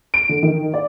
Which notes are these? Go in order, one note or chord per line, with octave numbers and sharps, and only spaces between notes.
D7
D3
D#3
D5